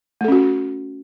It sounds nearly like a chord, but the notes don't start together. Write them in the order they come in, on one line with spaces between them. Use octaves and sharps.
A3 A4 C#4 F#4